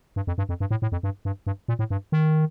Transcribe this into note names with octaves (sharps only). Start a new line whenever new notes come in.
G2
F2
G2
F2
G2
A2
A2
F2
G2
G2
G2
A#2
A2
G2
D#3